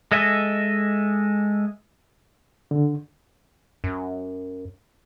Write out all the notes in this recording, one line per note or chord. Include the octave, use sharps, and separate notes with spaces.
G#3 A4 D#5 E5 G#5
D3
F#2